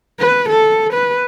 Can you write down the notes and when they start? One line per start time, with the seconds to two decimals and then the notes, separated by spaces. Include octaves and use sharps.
0.19 B4
0.49 A4
0.94 B4